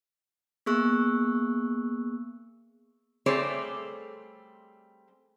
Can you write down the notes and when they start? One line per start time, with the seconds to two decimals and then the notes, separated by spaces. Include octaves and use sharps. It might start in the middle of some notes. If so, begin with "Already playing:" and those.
0.66 A#3 B3 G#4 C#6 E6 F#6
3.26 G3 A3 C4 G#4 C#5 D5